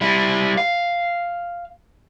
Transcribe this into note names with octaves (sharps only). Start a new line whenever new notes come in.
G3 E4
F5